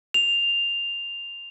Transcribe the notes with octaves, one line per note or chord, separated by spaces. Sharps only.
F7